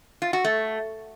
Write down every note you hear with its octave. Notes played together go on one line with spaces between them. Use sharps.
F4
F#4
A3